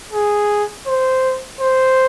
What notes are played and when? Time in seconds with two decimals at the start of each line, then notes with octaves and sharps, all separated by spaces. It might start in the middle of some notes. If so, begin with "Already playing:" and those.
0.12 G#4
0.87 C5
1.60 C5